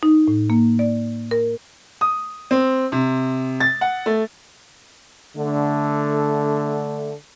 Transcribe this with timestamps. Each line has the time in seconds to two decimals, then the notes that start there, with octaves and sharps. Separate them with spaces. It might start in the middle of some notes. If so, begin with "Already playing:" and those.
0.03 D#4
0.28 A2
0.50 A#3
0.79 D5
1.31 A#4
2.01 D#6
2.51 C4
2.92 C3
3.60 A6
3.81 F#5
4.06 A3
5.37 D3 A3